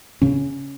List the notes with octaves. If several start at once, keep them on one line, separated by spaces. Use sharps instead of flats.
C#3 C#4